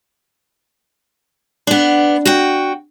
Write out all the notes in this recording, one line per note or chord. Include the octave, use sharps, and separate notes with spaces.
B3 D4
F#4 G5